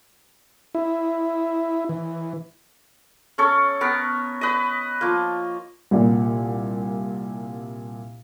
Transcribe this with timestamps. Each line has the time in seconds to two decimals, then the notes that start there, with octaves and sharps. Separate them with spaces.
0.75 E4
1.89 E3
3.38 C#4 A4 C#5
3.81 B3 A#4
4.41 B4 D#5
5.01 F3 A#3
5.91 C2 A#2